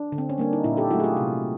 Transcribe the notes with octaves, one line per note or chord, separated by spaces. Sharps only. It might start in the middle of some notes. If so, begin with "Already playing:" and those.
Already playing: D4
D3
C4
C#4
G3 A#3 D4
D#4
A#2 D4 E4
G4 A4
F#3 A3 E4 F#4
G#4
F4 G4
C3